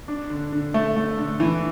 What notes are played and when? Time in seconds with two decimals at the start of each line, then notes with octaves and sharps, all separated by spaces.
0.08 D4
0.30 D3
0.52 D3
0.74 A3
0.96 A3
1.18 D3
1.40 E3